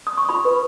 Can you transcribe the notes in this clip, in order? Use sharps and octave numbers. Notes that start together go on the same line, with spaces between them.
D#6
C#6
F4 B5
B4